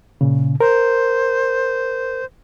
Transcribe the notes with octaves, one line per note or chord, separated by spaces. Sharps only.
A#2 C#3
A#4 C5